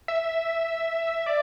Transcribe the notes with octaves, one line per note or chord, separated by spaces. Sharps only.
E5
D5